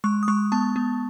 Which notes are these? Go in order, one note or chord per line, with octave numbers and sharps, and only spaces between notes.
G#3 C#6
D#6
G#3 C#6
B3 A5
B3